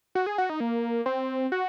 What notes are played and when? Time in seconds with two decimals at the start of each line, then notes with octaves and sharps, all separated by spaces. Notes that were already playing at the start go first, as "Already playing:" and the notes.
0.15 F#4
0.26 G#4
0.38 F#4
0.50 D#4
0.60 A#3
1.06 C4
1.52 F#4